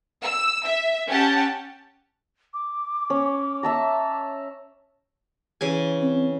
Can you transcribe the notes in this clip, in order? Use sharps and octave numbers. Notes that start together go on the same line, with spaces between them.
E6
E5
C#4 G4 F#5 A5
D6
C#4
E5 A5 A#5
C#3 E3 G#5
C4